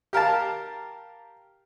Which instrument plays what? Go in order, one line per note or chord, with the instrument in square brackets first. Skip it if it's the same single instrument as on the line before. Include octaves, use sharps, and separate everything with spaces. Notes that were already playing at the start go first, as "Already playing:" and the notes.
[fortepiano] G4 A#4 F5 A5